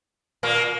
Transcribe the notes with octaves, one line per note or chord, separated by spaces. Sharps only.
A#2 A#3